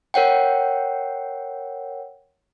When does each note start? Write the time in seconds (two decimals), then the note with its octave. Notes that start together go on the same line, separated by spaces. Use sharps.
0.14 A#4 C#5 F#5 G5